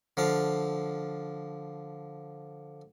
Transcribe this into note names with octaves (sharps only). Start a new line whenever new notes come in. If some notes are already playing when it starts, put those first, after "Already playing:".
D3 F3 F5